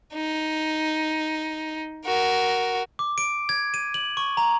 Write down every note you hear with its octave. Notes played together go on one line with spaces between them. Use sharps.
D#4
F#4 A#4
D6
D7
G#6
D#7
F#7
C#6
A#5